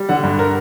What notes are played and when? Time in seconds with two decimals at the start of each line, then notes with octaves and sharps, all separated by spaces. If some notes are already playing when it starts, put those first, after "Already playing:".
Already playing: G3
0.09 D3 F#5
0.23 G2
0.39 A#4